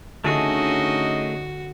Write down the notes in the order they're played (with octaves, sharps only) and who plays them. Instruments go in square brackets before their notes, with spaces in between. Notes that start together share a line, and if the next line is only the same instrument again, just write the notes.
[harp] D3 [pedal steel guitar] A3 G#4 [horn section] C#4 D#4 D#5 [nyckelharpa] F#4